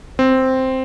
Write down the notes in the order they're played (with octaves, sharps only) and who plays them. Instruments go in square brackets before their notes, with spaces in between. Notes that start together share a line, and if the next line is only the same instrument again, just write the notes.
[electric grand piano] C4